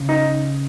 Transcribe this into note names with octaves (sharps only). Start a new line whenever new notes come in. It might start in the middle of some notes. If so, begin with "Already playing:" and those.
Already playing: C#3
D#4